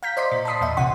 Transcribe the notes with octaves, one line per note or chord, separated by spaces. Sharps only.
F5 A#5 G6 B6
C5 D5 D#5 C6 B6
A#2
A5 B5 C6 D#6 B6 C7
E2 A#2 D#5 E5
B1 C3 F#5 C6